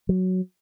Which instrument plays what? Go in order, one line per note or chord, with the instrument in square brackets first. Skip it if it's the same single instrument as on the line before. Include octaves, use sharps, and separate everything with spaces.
[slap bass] F#3